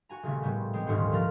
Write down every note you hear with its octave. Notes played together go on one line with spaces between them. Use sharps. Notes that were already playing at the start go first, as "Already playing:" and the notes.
F#4 G#5 A#5
D#1 C#3 A3
A2 C3 G3 B3
E3 G#3 C4 G4 C#5
D#1 D2 G#2 C5 F#5
C#2 F3 A#4 A6